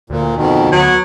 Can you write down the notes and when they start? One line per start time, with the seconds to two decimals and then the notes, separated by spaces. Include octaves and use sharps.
0.10 D2 A#2
0.36 F2 B2 D#3
0.72 F#3 B3